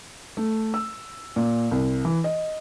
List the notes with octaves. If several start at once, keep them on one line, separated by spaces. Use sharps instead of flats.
A3
E6
A#2
C2
E3
D#5